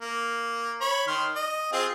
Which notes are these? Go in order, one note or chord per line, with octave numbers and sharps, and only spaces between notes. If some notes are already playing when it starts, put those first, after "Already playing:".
A#3
C#5 B5
D#3 C6 F6
D#5
C4 F4 G#4